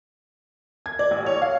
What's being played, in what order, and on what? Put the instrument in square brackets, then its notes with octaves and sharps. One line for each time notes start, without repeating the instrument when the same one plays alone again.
[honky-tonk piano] G#6
D5
A1
C#5
F5